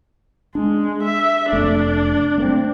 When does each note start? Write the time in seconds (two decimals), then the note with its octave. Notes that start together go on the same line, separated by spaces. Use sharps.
0.55 G#3 D4
1.03 E5
1.53 F1 C3 A3 D4
2.38 A3 A#3 C4